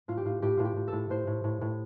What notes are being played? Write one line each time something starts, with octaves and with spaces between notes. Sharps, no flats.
A2 F4
G4
A2 F4
A2 G4
A2 F4
G4
A2
A4
A2
A2 C5
A2
A2
A2